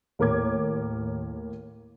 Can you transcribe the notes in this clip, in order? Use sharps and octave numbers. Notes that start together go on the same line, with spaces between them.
D#2 A2 A#4 C#5 D6 G#6